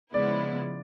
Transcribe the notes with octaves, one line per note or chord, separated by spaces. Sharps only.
C#3 F3 G#3 B3 E4 D5